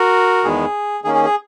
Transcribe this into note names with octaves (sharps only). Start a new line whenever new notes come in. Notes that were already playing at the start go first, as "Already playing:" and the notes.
Already playing: F#4 A#4
E2 D#3 G#3 B3 G#4
D#3 A#3 C#4 G#4
G#4
G#4